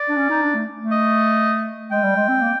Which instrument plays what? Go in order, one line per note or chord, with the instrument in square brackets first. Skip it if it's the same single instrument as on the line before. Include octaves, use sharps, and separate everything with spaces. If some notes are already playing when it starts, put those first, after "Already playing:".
Already playing: [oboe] D5
[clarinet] D4
C#4
D#4
D4
A3
A3
[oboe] D#5
[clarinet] G#3 [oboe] G5
[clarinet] G3
G#3
C4
A#3